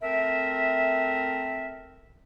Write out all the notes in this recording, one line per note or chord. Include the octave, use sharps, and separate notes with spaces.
A3 C4 A#4 E5